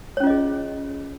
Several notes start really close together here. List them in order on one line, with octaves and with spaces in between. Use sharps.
C#5 C#4 F4 D#5 G#4